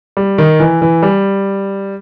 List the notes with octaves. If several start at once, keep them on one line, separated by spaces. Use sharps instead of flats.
G3
D#3
E3
E3
G3